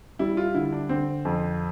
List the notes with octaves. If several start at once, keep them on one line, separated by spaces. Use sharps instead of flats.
G3 E4
F4
D3 E4
D4
D3 C4
F2